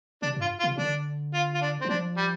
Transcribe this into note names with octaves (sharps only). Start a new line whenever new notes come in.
C3 D4
G2
F4
F4
C3
D3 D4
F4
F4
D4
C4
D3
F3 D4
G3